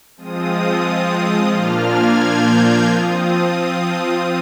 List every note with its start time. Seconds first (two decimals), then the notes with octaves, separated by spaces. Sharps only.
0.17 F3 G#3 C4 F4 D#6
1.51 A#2 F3 A#3 D4 F4 F6
1.85 G#6
2.18 G6
2.53 F6
2.85 F3 C4 F4 D#6